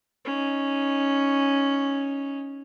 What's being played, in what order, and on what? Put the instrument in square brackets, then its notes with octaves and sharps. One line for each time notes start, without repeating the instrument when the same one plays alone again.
[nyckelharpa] C#4 D#4